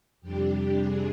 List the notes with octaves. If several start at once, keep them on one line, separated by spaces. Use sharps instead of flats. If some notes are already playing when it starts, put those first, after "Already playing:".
F2 C3 G3 D4 G4
G#4